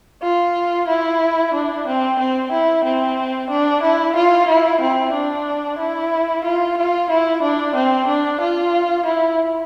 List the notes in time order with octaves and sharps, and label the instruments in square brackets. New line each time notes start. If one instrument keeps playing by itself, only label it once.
[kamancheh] F4
E4
D4
C4
C4
E4
C4
D4
E4
F4
E4
C4
D4
E4
F4
F4
E4
D4
C4
D4
F4
E4